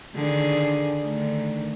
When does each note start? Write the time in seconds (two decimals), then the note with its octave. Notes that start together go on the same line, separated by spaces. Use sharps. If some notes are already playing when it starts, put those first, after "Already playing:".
0.15 D3 D#3 G#4
1.05 D3 D#3 A3